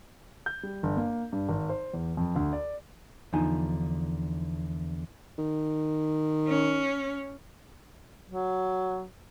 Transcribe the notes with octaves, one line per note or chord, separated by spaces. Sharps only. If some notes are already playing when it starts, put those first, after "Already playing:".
G6
G3
G1
A#3
G2
G#1
C5
E2
F2
D2
D5
E2 D3 F3 D#4 G#5
D#3
C#4
F#3